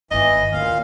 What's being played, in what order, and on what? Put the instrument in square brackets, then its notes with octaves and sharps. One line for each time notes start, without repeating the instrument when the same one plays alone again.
[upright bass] G1 D#3 [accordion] E3 [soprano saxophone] D#5
[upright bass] A1 D2 [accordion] A#2 F5